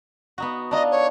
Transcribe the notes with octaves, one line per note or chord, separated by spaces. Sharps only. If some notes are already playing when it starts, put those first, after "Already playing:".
B3 D#4 F#4
D4 D#4 F4 D#5
C#5